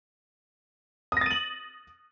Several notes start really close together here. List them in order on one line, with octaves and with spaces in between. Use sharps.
D#6 A#6 A6 D#7 F#7